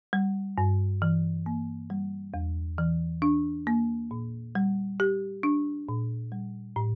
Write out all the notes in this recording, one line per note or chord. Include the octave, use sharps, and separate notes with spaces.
G3
G2
E3
A#3
G3
E2
E3
D4
A#3
A#2
G3
G4
D4
A#2
G3
A2